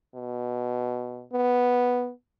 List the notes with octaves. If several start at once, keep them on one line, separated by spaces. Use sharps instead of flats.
B2
B3